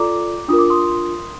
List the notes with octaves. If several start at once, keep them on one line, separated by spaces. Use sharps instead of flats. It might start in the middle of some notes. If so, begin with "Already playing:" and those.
Already playing: F4 A4 D5 A#5 D6
D4 F4 A#4 D#6
D6
C6 D#6